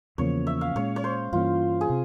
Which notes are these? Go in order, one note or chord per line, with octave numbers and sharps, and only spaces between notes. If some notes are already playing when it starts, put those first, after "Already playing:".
E2 C#3 F3 A#3 C#5
E5
F5
A#2 G#3 C#4 C#5
C#5
C5
G2 E3 A#3 C#4 F4
G#4
C3